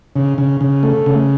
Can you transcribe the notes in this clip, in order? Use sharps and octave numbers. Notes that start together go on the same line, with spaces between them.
C#3
C#3
C#3
A3
C#3